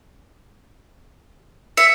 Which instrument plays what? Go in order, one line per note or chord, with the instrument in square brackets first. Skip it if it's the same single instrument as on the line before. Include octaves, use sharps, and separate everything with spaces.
[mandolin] E5 [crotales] C#7